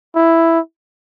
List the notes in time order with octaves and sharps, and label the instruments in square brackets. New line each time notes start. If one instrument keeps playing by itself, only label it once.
[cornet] E4